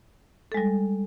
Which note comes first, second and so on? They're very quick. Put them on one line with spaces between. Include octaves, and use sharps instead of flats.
A4 G#3 G3